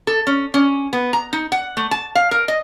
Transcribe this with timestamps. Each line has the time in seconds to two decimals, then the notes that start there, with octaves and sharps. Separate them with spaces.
0.07 A4
0.27 C#4
0.54 C#4
0.93 B3
1.13 A#5
1.33 D#4
1.52 F#5
1.77 A3
1.91 A5
2.15 F5
2.31 A#4
2.48 D#5